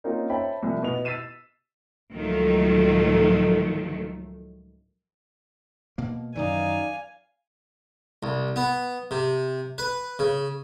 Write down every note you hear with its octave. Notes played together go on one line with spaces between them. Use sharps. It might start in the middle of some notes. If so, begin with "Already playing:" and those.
A#3 C4 C#4 D#4 F4 A#4
C5 C#5 E5 G5 A5 B5
C2 F3
B2 B3 E4 F7
E6 A6 B6 C7 D#7 E7
C#2 A2 D#3 F3 F#3 A3
B2 A#3
F#2 D#3 E3 D#4 D5 F5 G#5
C2
B3
C3
B4
C#3